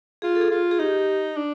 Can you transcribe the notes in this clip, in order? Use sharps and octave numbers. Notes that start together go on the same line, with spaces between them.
F4 G#4
A4
G#4
F4
G#4
D#4 G4
D4